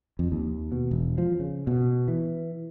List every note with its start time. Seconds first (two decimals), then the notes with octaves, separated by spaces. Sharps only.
0.19 F2
0.32 D#2
0.72 B2
0.91 E1
1.18 F3
1.40 C#3
1.67 B2
2.08 E3